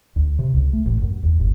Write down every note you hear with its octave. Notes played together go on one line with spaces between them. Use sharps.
D2
C3
C#2
A3
A1
F#2
E2
G1